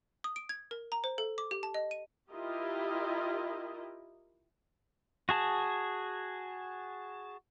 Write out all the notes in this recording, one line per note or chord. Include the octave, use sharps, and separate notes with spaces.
D#6
D7
G#6
A#4
A#5
C5
A4
D6
G4
A5
D#5
D#7
E4 F4 G4 A#4 D#5
F#4 G#4 A5